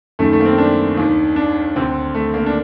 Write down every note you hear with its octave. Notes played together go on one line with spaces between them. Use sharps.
F#2 D#3 A3
A3
A#3
C4
D4
D#2 D#3
D4
D2 D3 C4
A3
A#3
D4